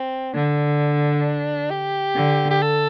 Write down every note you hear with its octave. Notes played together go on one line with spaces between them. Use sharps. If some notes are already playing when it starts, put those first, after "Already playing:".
Already playing: C4
D3 D4
G4
D3
G4
A4